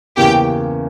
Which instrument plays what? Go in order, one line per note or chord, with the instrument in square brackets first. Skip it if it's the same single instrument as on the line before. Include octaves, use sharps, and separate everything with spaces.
[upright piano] E2 C#3 E3 A#3 C#4 [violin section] G4 G5